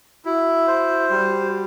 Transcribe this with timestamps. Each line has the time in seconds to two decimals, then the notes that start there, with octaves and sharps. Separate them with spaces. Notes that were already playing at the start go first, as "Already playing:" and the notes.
0.25 E4 F#4
0.68 C5
1.10 G3